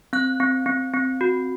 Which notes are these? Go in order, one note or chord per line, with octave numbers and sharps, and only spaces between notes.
C4 F#6
C4
C4
C4
F#4